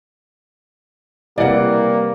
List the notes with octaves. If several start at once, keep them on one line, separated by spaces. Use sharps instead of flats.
C3 E3 G3 A#3 D5 F#5